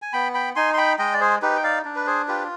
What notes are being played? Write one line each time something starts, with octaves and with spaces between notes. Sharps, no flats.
G#5
B3 G5 B5
G5 B5
D#4 G#5 C6
C6
G5 B5
G#3 D#5 G5
D5
G#4 C5
D#4 G4 B4
G5
D5 F5
D4
B4
G#4 C5
F4 G4 B4